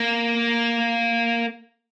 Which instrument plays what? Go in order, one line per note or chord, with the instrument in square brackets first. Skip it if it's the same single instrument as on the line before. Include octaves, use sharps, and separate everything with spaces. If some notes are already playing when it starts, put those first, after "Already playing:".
Already playing: [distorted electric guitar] A#3